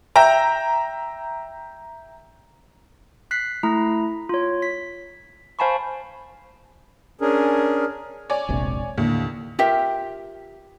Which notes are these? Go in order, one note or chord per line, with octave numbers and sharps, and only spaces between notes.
E5 G5 A#5
F#6 B6 C7
A3 E4 A#5
F4 C#5
B6
C5 F5 G#5 A5 B5 C#6
C#4 D4 G#4 A#4
C#5 D5 G#5
E1 A#1 C3
D#2 A2 D3
F4 G4 A#4 E5